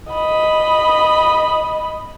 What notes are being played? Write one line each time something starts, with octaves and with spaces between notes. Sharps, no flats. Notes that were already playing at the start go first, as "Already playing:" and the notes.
D#5 B5